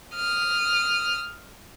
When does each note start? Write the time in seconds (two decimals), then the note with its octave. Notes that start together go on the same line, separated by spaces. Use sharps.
0.15 D#6 F6